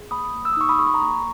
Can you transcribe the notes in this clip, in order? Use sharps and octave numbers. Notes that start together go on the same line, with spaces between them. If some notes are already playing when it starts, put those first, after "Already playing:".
Already playing: G#4
A#3 B5 D#6
A#3
E6
D#6
D#4 C#6
B5 D#6
G#4 C#6
B5
A#5 C#6
A#3